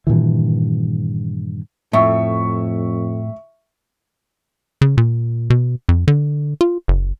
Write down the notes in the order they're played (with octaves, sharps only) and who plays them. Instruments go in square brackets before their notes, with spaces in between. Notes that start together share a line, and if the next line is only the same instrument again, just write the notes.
[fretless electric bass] G2 A#2 D#3 E3
[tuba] F2 [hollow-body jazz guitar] A2 [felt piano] E5 C#6
[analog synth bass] C#3
A#2
B2
F2
D3
F4
F#1